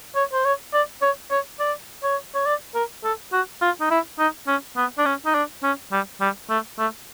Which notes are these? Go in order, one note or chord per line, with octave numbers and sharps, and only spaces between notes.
C#5
C5
C#5
D5
C#5
C#5
D5
C#5
C#5
D5
A#4
A4
F#4
F4
D#4
E4
D#4
C#4
B3
D4
C#4
D#4
D4
C#4
G3
G3
A3
A3